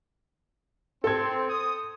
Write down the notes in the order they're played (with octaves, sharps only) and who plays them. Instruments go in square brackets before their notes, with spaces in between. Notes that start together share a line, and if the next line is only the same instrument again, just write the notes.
[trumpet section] C4 [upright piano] A4 G#6
[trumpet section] D#6